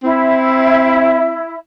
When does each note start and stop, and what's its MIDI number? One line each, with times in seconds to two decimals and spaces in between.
0.03 1.42 60
0.03 1.56 64